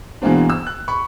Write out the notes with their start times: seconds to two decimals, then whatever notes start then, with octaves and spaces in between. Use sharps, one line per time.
0.22 B2 E3 G#3 A#3 C4 D4
0.50 E6
0.66 F#6
0.88 B5 C#6